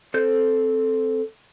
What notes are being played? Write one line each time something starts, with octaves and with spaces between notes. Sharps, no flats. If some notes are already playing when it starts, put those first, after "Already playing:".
C4 A4 C5 G6